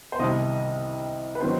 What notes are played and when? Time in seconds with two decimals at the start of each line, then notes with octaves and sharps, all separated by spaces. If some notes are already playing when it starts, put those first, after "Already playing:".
0.12 C5
0.19 C2 C3 D#3 G3 D#5
1.35 B4
1.41 D#3 F#3 C5